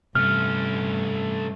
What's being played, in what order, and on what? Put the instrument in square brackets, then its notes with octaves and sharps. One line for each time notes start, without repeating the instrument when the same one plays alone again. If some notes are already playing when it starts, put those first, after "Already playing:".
[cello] G2 [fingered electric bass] C3 [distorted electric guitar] A3 C#4 [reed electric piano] F6